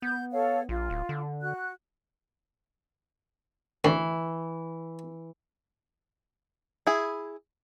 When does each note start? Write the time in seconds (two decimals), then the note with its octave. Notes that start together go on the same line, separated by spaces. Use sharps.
0.02 B3 G6
0.32 A4 C#5 F5
0.69 A#1 F4
0.90 D1
1.09 D3
1.41 F#4 F#6
3.84 D2 E3
6.87 E4 G#4